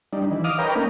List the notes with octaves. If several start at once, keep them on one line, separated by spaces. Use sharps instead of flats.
G3 D4 D#4
E3
D#5 F5 D6 D#6 F6
A#4 B4 C#5 G5 A#5
A3 A#3 C#4 D#4